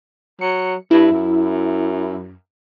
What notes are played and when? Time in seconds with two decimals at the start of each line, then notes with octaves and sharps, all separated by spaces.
0.41 F#3 C#7
0.91 G2 E4
1.12 F#2